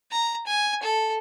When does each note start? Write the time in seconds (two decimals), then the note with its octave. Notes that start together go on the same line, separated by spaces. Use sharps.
0.11 A#5
0.47 G#5
0.83 A4